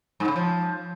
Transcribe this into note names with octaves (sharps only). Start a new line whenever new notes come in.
G#2
C#3
F3